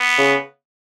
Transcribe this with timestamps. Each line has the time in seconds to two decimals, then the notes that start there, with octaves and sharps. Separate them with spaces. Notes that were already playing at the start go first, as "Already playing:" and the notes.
Already playing: B3
0.18 C#3